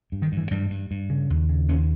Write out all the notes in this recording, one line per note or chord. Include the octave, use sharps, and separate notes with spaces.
G2
D#3
G2
E3
G2 G3
G2
G2
C#3
D#2
C#3
D#2 C#4